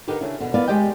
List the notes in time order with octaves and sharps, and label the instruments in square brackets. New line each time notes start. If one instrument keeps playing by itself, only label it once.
[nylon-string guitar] D3 D#4 G4 A#4 B4
C#3 D4 E4
B2 D3
B3 E4 A#4 D5 F5
G#3 G4 D5 D#5 G5